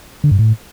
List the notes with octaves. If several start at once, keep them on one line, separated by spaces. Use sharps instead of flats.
D3
G2
A2